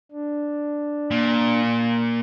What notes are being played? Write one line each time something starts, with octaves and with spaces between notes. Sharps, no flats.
D4
A#2